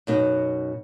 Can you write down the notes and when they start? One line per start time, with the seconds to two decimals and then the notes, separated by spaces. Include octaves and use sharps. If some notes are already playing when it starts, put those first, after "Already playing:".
0.07 F#2 B2 D#4